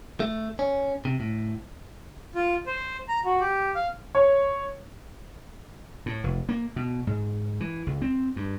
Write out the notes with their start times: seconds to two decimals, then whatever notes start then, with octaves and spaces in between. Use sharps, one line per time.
0.20 A3
0.59 C#4
1.05 C3
1.20 A2
2.35 F4
2.66 C5
3.09 A#5
3.25 F#4
3.40 G4
3.75 F5
4.15 C#5
6.06 A2
6.24 F1
6.49 A#3
6.76 B2
7.07 G#2
7.60 E3
7.87 C#2
8.02 C4
8.36 G2